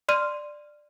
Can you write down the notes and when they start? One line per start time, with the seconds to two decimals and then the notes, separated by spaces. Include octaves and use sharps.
0.09 D5 C6 F6 D#7